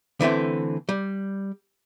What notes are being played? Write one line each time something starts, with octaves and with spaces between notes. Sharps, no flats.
D3 E3 A3 C4
G3